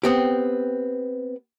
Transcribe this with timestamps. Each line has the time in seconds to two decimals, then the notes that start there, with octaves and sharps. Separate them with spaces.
0.03 B3 C4 G4